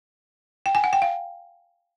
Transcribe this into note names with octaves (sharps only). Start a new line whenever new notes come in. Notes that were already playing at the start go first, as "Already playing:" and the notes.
G5
G#5
F#5
G5
F5